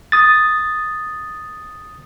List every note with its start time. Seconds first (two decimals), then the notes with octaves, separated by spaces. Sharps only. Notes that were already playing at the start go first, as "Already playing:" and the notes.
0.12 D#6 A6